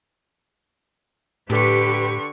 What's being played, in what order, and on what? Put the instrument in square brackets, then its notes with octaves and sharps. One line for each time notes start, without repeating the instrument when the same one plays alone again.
[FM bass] A2 [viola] D3 C#6 [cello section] G4 B4